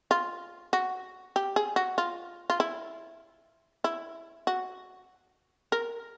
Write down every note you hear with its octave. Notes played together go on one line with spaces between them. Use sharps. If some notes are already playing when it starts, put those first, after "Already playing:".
F4
F#4
G4
G#4
F#4
F4
F4
E4
E4
F#4
A#4